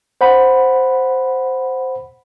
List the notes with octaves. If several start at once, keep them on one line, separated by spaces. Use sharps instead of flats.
C5 F#5 B5